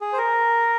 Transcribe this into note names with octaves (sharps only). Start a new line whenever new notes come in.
G#4
C5
A#4